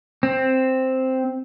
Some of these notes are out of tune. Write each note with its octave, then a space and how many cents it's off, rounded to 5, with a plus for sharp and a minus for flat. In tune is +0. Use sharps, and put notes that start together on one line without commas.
C4 +0